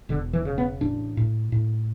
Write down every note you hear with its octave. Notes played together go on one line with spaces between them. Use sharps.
E1 D3
E3
C#3
B3
A1 D4
A2
A2